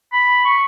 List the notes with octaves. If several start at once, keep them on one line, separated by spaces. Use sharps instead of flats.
B5
C#6